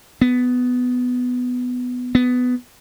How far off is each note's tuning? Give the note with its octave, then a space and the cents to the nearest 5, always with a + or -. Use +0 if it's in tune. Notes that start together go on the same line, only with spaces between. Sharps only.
B3 +10
B3 +15